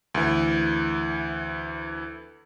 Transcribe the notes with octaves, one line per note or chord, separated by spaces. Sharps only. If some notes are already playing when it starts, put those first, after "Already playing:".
D2 E3